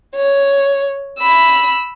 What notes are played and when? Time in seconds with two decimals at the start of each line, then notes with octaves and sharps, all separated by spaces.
0.16 C#5
1.19 B5 E6